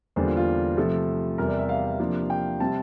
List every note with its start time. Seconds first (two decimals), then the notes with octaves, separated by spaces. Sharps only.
0.16 E2 D3 G3 A#3 D4 C5
0.26 F4
0.37 F4
0.77 C3 F3 A3 A4
1.38 E2 C3 G3 A#4
1.48 D5
1.59 E5
1.69 F5
1.99 C3 F3 A#3 D4
2.30 G5
2.60 C3 G3 C4 A5